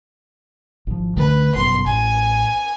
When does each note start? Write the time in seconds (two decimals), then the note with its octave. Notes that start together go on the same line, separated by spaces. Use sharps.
0.87 G#1 F3
1.17 C#2 D3 A3 B4
1.55 G1 F#2 B2 C6
1.86 A1 G#5